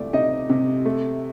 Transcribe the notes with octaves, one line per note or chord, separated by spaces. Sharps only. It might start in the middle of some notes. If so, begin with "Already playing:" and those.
Already playing: C3 A3 D5 D6
C3 D#4 D#5
C3
A3